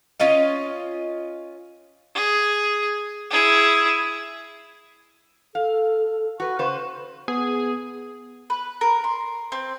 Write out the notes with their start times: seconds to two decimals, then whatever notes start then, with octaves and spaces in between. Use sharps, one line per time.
0.20 C#4 F4 D#5 F5
2.15 G#4
3.31 E4 G#4
5.55 A4 F5
6.40 F#4 B4 C#6
6.59 C#3 B4 C5
7.28 B3 G#4
8.50 B4
8.81 A#4
9.04 C6
9.52 C4